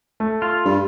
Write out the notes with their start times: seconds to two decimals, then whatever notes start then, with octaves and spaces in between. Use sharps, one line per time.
0.20 A3
0.42 F4
0.65 G2